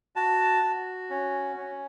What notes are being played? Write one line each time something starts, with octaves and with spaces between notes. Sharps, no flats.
F#4 A5
F#4
C#4
C#4